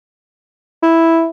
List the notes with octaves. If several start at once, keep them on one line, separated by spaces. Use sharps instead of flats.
E4